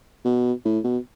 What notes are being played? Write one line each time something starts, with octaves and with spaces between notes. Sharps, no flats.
B2
A2
B2